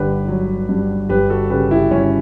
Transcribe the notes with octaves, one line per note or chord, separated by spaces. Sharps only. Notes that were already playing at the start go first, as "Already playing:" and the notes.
Already playing: G1 D3 G4 B4
F#3
G2
G1 G4 B4
F#4 A4
C#3 G4 B4
E4 G4
G1 C#4 E4